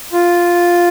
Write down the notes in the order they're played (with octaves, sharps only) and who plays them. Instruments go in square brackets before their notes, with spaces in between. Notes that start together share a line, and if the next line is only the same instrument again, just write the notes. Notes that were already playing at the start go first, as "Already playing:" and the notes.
[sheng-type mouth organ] F4